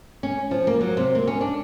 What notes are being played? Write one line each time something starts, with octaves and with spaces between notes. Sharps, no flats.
C#4
F3
A#3
F#3
C3
A#3
C#4
D4